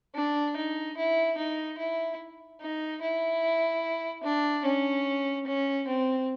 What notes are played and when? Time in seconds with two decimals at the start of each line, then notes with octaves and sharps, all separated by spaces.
0.15 D4
0.56 D#4
0.97 E4
1.38 D#4
1.78 E4
2.60 D#4
3.01 E4
4.23 D4
4.64 C#4
5.47 C#4
5.87 C4